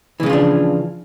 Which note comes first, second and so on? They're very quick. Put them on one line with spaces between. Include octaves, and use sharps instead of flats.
E3 C#3 F3 F4 D4